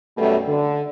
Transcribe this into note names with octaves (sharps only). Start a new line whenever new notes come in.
F#2 B2 G3 A3
D3